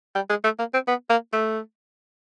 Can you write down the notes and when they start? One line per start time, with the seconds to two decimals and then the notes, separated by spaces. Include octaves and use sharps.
0.15 G3
0.30 G#3
0.44 A3
0.59 A#3
0.74 C4
0.87 B3
1.10 A#3
1.33 A3